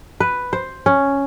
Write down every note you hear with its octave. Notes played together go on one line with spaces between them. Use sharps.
B4
C5
C#4